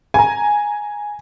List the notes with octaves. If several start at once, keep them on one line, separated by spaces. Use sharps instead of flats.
G#5 A#5